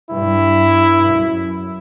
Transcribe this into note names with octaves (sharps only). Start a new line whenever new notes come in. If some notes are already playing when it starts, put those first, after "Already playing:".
G2 E4
F#2